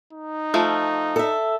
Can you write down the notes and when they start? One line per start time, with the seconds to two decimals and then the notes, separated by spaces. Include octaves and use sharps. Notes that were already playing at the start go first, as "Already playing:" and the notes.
0.13 D#4
0.54 F3 A3
1.16 A4 E5